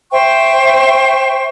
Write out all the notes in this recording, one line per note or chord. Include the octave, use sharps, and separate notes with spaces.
C5 E5 G5 C#6